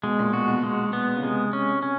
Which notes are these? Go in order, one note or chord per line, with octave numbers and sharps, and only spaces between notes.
B2 G#3
A#2
B2 F#4
B2
B2 G#3
B3
C#3
C3 G#3
C#4
C#4